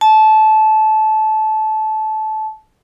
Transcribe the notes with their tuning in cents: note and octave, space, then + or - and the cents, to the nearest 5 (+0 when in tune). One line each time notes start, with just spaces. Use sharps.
A5 -20